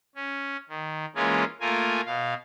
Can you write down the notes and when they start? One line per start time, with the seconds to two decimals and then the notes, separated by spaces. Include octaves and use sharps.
0.15 C#4
0.69 D#3
1.15 E3 G#3 A#3 C#4 F4 G#4
1.61 A3 A#3 F4 A#4 G#5
2.06 B2 F5